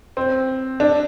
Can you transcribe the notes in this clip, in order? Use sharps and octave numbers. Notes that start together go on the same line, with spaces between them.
C4
D4